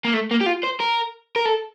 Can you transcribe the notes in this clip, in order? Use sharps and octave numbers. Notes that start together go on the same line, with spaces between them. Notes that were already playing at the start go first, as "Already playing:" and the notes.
A#3
A3
A#3
G4
F4
C5
A#4
A#4
A4